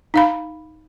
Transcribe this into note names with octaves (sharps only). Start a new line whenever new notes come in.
D#4 F5 B5